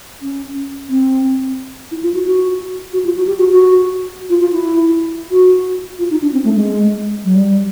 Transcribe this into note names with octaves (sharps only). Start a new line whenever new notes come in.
C#4
C4
E4
F4
F#4
F#4
F#4
F4
F#4
G4
F#4
F#4
F4
F4
E4
F#4
F4
D#4
D4
C4
A3
G#3
F#3
G3